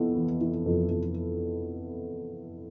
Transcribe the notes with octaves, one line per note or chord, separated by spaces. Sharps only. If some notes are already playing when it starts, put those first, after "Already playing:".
Already playing: F2 E3 B3 E4
E3
E3
F2
F2